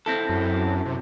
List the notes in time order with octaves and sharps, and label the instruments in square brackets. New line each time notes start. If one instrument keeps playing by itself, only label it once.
[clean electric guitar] C4 E4 A4
[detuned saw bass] F#2
C3